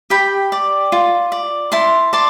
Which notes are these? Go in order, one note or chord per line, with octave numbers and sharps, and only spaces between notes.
G4 G5 B5
D5
F4
D5
E4 A5 C6
D5 A5 C6